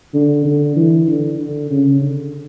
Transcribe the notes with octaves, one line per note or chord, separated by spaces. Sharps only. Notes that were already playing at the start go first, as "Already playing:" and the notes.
D3
D3
E3
D3
D3
C#3
D3